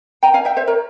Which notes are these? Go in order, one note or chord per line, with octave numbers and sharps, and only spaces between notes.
G5 A#5
F5 G#5
E5 G5
C5 E5
A#4 C#5